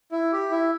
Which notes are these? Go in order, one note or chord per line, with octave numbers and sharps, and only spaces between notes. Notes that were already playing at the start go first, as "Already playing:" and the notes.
E4
G4
E4